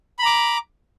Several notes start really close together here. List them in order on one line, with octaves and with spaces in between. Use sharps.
B5 A#5 D6